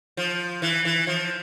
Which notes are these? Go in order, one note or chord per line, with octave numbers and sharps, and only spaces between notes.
F3
E3
E3
F3